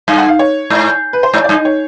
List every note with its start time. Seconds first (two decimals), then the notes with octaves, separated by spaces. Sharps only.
0.08 G2 F5
0.18 F#5
0.29 F5
0.39 C#5
0.70 G#2
1.13 B4
1.23 C5
1.33 G#2 C#5
1.44 D5
1.49 G2
1.54 D#5
1.65 C#5